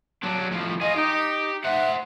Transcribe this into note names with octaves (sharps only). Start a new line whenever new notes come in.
F#3 D4
A2 F3
F4 G#4 D#5
D#4 G4
C5 E5 F#5